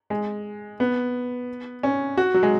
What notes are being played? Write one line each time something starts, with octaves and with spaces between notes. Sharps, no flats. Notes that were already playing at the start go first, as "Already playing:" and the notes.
G#3
B3
C#4
F#4
F#3
G#3